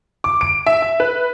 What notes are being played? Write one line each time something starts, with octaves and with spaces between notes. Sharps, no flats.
D6
D7
E5
E5
B4